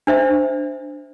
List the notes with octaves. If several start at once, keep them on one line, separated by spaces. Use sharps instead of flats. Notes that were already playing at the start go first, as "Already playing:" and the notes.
D4 C5 E5